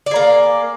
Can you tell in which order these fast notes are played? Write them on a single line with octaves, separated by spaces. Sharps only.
D5 G#4 A#3